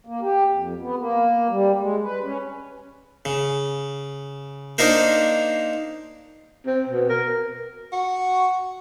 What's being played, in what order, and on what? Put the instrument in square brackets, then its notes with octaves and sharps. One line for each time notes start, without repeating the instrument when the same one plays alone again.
[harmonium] A#3
G4
F2
B3
A#3
G3
G#3
B4
C#4
[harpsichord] C#3
A#3 D4 D#4 F4 A#4 C5
[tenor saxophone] C4
B2
A#4
F#4